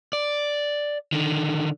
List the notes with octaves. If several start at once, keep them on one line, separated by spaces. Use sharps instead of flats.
D5
D3 D#3